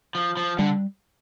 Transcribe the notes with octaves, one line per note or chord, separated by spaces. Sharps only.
F3
F3
D3 G3